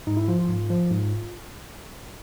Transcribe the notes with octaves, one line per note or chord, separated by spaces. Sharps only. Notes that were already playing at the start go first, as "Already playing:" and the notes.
G#2 D#4
E4
F3 F4
F4
G#2
F3
G#2